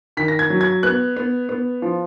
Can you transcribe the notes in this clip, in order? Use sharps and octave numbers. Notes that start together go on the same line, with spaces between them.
D#3 B6
A#6
G#6
F#3
G#6
B3 F#6
B3
B3
F3